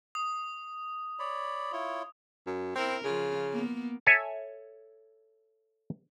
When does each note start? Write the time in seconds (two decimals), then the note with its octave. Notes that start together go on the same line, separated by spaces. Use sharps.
0.15 D#6
1.19 C#5 D5 B5
1.72 E4 F4 C#5
2.47 F#2
2.76 C4 E4 A#4
3.05 C#3 F3 F4
3.52 A#3 B3
4.06 A4 C#5 E5 G#5